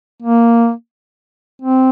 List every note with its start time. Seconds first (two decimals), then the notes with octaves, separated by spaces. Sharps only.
0.22 A#3
1.62 C4